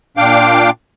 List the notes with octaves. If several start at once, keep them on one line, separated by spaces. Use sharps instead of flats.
A#2 D4 F5 G5 D6